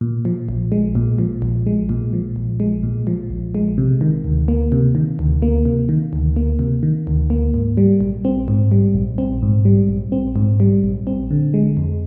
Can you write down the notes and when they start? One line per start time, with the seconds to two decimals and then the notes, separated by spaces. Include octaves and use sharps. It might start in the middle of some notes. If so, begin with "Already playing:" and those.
0.01 A#2
0.25 F3
0.49 A#1
0.72 G#3
0.95 A#2
1.19 F3
1.42 A#1
1.66 G#3
1.89 A#2
2.13 F3
2.36 A#1
2.60 G#3
2.83 A#2
3.07 F3
3.30 A#1
3.55 G#3
3.78 C3
4.01 D#3
4.24 D2
4.48 A#3
4.72 C3
4.95 D#3
5.19 D2
5.42 A#3
5.65 C3
5.89 D#3
6.13 D2
6.36 A#3
6.59 C3
6.83 D#3
7.07 D2
7.30 A#3
7.54 G#2
7.77 G3
8.01 A#1
8.25 C4
8.48 G#2
8.71 G3
8.94 A#1
9.18 C4
9.42 G#2
9.65 G3
9.89 A#1
10.12 C4
10.36 G#2
10.60 G3
10.84 A#1
11.07 C4
11.31 D3
11.54 G#3
11.77 F2